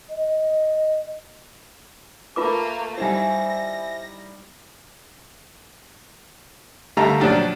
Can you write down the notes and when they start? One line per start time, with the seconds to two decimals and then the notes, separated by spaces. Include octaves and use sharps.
0.10 D#5
2.36 A3 A#3 F4 B4 D6
2.98 G3 D#4 E4 C5 E5 G#5 A#6
6.97 D3 G3 A3 A4 F5 A#5
7.20 A#2 F3 F#3 D4 G4